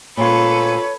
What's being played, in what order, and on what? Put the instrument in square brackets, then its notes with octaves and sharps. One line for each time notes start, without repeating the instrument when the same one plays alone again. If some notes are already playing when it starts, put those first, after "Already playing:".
[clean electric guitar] D2 F4 [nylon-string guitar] A#2 [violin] A4 B4 [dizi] C#5